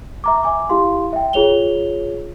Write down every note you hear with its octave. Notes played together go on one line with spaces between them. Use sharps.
E5 A#5 D6
E5 G#5 D6
E4 G4 F5 C6
E5 G5
F4 G#4 C#5 F7 G7